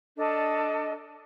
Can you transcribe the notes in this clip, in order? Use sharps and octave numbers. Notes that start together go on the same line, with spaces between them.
D4 A4 D5 D#5